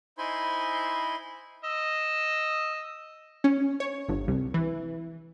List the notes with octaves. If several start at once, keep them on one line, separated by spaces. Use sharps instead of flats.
D#4 E4 C5 G#5 B5 C6
D#5 E6
C#4
C#5
G1
C2
E3